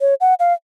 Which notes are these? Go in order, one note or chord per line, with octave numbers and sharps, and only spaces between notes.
C#5
F#5
F5